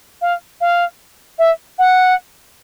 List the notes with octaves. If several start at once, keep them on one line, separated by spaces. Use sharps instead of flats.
F5
F5
E5
F#5